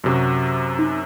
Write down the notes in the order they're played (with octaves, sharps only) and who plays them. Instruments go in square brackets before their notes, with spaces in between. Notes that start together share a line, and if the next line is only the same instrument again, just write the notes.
[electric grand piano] F#2 C3 F#4
[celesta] D#4